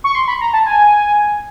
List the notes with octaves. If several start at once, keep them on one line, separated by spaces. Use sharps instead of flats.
C#6
C6
B5
A#5
A5
G#5